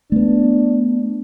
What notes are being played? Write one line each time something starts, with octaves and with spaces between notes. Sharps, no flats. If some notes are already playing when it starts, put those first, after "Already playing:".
A3 B3 D4